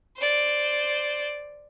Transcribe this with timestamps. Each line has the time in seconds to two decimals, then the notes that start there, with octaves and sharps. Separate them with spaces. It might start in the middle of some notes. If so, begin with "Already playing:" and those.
0.17 C5 D5